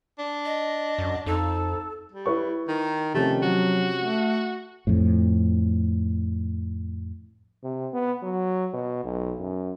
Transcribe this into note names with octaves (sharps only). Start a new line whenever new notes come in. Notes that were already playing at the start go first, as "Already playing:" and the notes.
D4
D#5
F#2
F2 D#4 A4
G3
E4 B4 C#6
D#3
C3 D#3 F3 A3 C#4
F#3 F#4
A3
F2 A2
C3
B3
F#3
B2
B1
F#2